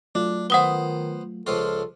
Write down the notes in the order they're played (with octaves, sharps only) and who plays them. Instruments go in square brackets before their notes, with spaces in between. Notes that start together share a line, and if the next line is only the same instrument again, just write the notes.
[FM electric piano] F#3 A3 F4 [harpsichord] D4
[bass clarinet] D#3 [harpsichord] B3 C5 [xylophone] F#5 D#6 G7
[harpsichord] C#2 F3 F4 [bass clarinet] A4